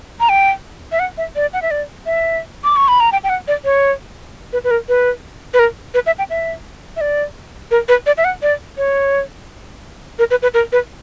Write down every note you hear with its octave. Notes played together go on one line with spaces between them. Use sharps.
A#5
G5
E5
F#5
E5
D5
F#5
E5
D5
E5
D6
C#6
B5
A#5
G5
G5
F#5
D5
C#5
B4
B4
A#4
B4
B4
A#4
B4
E5
G5
E5
E5
D5
A#4
B4
D5
E5
F#5
D5
C#5
A#4
B4
B4
A#4
B4